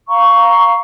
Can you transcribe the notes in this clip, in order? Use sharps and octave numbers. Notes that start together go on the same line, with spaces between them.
F5 A#5 C#6